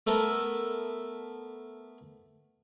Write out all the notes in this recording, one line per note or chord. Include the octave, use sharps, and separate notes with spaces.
A3 B3 A4 A#4